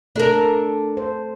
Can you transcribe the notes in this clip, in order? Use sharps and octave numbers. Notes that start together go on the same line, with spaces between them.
A3 D4 A4 A#4
C5